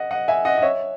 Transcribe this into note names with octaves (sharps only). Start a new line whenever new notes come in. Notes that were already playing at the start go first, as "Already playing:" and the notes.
Already playing: D#5 F#5
D#5 F#5
E5 G#5
D#5 F#5
D#5
C#5 E5